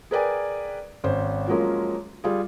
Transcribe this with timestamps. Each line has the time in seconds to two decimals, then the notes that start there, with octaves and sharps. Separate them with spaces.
0.11 G#4 A#4 B4 D5 G5 G#5
1.04 G#1 C#4 C5
1.47 F3 F#3 G#3 A#3 C#4 F4
2.24 G3 F4 G#4